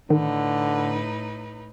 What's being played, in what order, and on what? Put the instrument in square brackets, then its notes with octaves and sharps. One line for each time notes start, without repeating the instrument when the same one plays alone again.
[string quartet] A2 D#4 B4 [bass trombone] D3 [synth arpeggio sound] D#3